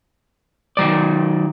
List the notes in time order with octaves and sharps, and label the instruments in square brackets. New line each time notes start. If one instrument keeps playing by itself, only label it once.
[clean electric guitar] D#3 F#3 D5